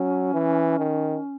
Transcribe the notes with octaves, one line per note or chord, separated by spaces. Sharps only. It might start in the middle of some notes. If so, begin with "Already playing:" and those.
Already playing: F#3 C#4
E3
D#3